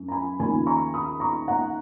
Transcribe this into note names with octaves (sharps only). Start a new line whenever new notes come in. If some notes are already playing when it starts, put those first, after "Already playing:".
Already playing: F#2
A#5
G#5 B5
D#2 C#3 F3 G#5 B5
A#5 C#6
B5 D#6
A#5 C#6
F#5 A#5